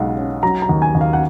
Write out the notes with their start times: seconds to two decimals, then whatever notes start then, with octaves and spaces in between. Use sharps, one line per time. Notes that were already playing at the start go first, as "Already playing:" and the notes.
Already playing: B1 G#3 F5 F#5
0.17 C#4
0.43 F#3 A#5
0.62 A#5
0.69 D#2
0.82 G#5
0.95 D#2
1.01 F5
1.13 F#5